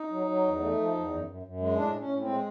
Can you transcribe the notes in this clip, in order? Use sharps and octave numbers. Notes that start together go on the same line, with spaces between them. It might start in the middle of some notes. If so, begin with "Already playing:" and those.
Already playing: D#4
F#3
F#3
E2
A3
F3
E2
F#2
F#2
F#2
G#3
A2 D4
A2
C#4
A2
C4
G#3